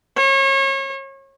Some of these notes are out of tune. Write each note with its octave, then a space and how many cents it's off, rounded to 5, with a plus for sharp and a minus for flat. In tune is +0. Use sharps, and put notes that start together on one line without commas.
C#5 -35